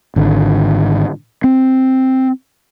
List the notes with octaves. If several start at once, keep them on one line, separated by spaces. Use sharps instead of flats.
G#1 D3
C4